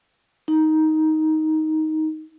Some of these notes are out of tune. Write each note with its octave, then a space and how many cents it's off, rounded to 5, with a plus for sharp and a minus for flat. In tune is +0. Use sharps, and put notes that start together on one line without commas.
D#4 +10